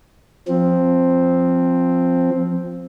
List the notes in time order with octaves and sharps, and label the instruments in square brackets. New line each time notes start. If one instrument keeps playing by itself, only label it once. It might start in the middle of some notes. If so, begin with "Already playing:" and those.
[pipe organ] F3 C4